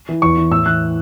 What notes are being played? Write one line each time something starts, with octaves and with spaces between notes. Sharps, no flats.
E3
E2 C#6
E3
A2 E6
E3 F#6